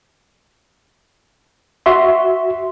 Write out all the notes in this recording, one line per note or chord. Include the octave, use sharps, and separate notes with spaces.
F#4 E5 C6